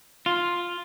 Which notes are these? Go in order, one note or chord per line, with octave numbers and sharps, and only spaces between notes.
F4